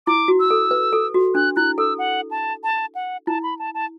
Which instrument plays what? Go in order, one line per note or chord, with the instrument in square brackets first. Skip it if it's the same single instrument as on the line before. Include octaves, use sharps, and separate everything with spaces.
[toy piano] E4 [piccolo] D6
[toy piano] F#4
[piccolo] E6
[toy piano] A4
B4
A4
F#4
[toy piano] D4 [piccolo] F#6
[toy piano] E4 [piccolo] F#6
[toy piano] A4 [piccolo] E6
[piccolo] F#5
A5
A5
F#5
[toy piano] E4 [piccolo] A5
[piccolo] B5
A5
A5